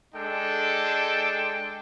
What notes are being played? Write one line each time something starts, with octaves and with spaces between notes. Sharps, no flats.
G#3 D4 A4 G5